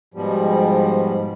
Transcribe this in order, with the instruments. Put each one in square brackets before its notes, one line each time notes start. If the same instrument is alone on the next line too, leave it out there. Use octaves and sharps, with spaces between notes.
[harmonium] G#2 B2 F3 G3